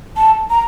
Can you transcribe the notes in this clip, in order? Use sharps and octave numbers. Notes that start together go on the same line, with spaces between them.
A5
A#5